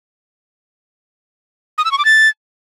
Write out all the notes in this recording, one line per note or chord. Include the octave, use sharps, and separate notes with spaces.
D#6
E6
C#6
D6
A6